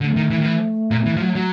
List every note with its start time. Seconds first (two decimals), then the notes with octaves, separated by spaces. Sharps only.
0.01 D3 A3
0.16 D#3
0.30 E3
0.41 D#3
0.45 E3
0.91 A#2
1.06 E3
1.17 F3
1.22 F#3
1.35 F#3